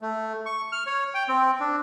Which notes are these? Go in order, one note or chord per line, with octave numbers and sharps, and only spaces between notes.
A3
C#6
F6
C#5
G5
C4
D4